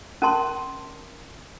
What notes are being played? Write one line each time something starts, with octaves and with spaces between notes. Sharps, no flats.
C#4 A#4 A5 C6